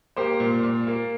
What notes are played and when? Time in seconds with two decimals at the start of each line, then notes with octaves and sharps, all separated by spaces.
0.16 A#3 G4 C5
0.40 A#2
0.63 A#2
0.87 A#3